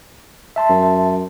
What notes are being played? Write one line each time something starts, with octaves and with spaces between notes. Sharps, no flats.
E5 A5 C6
F#2